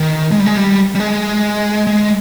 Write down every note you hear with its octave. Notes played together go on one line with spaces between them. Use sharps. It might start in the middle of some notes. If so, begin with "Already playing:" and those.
Already playing: D#3
G#3
G3
G#3
G3
G3
G#3
G#3